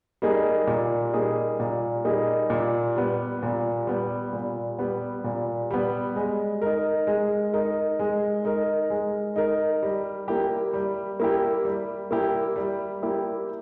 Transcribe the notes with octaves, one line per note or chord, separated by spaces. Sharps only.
G3 A#3 D#4 G#4
A#2
G3 A#3 D#4 G#4
A#2
G3 A#3 D#4 G#4
A#2
G3 B3
A#2
G3 B3
A#2
G3 B3
A#2
G3 B3
G#3
D#4 A#4
G#3
D#4 A#4
G#3
D#4 A#4
G#3
D#4 A#4
G3
A#3 E4 G4
G3
A#3 E4 G4
G3
A#3 E4 G4
G3
A#3 E4 G4